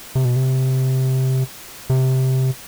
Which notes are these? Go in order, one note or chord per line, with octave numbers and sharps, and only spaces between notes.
C3
B2
C3
C3